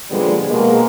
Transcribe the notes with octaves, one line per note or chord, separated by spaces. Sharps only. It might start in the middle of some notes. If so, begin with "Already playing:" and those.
A#2 D3 F3 G3 G#3 B3
B2 G#3 A#3